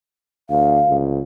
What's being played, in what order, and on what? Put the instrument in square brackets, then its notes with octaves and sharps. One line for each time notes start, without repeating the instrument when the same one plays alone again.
[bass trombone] D2 [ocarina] F5
[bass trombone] C#2